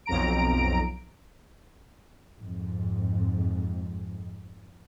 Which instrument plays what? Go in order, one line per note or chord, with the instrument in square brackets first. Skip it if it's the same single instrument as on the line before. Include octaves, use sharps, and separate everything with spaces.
[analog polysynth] B1 F2 A#5 D7
[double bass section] F2 G#2